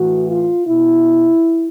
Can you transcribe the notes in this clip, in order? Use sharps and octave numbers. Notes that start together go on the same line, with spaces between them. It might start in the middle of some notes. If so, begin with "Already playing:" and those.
Already playing: A2 E3 F#4
F4
B2 E4